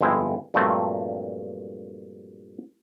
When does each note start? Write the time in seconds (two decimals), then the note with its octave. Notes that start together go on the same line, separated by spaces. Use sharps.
0.01 G1 F2 G#3 C4 E4
0.54 G2 A#2 F3 F#3 A3 C4